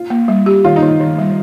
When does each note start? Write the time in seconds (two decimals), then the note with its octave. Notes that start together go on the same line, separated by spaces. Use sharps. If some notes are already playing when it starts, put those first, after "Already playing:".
Already playing: F4
0.10 A#3
0.28 G3
0.46 G4
0.64 D#3 F4
0.76 D#4
0.82 D#3
0.88 D#4
1.00 D#3
1.18 G3